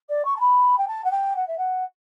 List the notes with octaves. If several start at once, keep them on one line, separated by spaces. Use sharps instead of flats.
D5
C#6
A5
B5
G5
A5
F#5
G5
F#5
E5
F#5